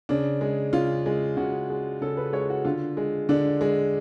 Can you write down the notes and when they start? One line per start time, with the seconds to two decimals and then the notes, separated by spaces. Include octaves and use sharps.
0.09 C#3 D4
0.41 G#3
0.73 C#3 F4
1.06 G#3
1.37 C#3 F#4
1.70 G#3
2.01 C#3 A4
2.17 B4
2.33 G#3 C#5
2.50 F#4
2.65 D3 F4
2.97 G#3
3.29 D3 D4
3.61 G#3